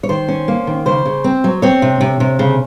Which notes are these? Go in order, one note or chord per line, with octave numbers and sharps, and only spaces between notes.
C#5
D#3 C5
C#4
A#3
D#3
C#3 C5
C#3
C4
F#3
C4 C#5
C3
C3
C3
C#3